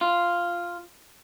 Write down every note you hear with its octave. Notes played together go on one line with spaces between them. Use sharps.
F4